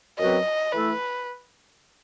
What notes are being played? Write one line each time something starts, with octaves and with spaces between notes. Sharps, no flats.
F#2 F#3 C4 F#4 B4 D#5
E3 A3 E4 A4 B4